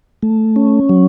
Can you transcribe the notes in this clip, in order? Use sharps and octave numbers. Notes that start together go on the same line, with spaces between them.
A3
C#4
F#3